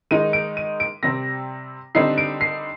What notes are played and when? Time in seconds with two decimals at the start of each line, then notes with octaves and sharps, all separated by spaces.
0.11 D#3 G#3 D#4 D#7
0.33 D7
0.57 D#7
0.80 D7
1.03 C3 G3 C4 A#6
1.95 D3 G3 C4 D#4 C7
2.18 D7
2.41 C7